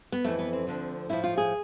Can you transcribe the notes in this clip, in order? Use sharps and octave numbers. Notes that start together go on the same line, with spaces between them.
B3
F2 E3 A3
B3
C4
D2 D3 F3
A2 F3 E4
F4
G#4